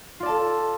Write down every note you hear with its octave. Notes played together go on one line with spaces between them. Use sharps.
F4 A4 D5 A5